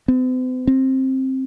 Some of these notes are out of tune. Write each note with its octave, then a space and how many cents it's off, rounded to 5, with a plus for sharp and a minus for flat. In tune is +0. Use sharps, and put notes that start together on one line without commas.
C4 -45
C4 +15